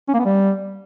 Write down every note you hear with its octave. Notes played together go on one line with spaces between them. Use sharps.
C#4
A#3
B3
G3